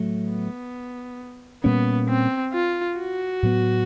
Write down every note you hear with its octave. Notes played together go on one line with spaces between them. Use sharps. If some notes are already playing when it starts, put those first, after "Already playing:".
Already playing: A2 F#3 A3
B3
A#2 G3 A#3 B3 C#4
C4
F4
F#4
A2 F#3 B3